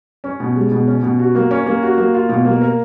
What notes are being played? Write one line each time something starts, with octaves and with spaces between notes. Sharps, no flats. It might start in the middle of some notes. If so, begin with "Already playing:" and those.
C#4
B2
G#3
B2
C#4
B2
F#4
A#3
C#4
A#3
F#4
A#3
F4
B2
A#3
A#4